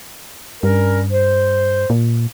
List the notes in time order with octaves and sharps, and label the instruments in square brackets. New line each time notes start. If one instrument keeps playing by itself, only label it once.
[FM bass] G2 [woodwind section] G3 C#4 A#4
[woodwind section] C5
[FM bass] A#2